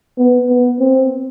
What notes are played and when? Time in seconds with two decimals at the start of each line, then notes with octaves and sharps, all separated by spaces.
0.18 B3
0.49 B3
0.79 C4